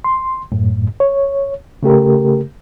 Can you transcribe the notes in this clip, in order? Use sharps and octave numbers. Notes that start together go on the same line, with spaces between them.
C6
F#2 A2
C#5
C#3 A3 G4 A#4